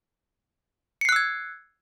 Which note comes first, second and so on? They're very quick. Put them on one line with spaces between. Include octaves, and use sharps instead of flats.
C#7 C7 F#6 E6 G#6